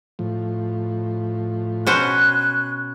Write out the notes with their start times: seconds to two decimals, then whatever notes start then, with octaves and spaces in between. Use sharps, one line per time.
0.19 A2 F3
1.87 B2 C#4 C5 F#6